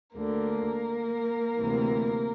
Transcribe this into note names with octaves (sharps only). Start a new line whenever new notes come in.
D2 D3 A#3 A#4
D2 C3 E3